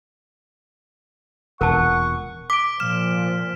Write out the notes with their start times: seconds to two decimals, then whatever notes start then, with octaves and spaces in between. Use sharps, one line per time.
1.61 E1 A#2 A#4 F#5 A5 C#6
2.50 D6 B6 D7
2.80 A#2 F3 F6 E7